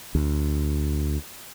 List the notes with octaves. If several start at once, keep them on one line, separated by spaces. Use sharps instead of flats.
D2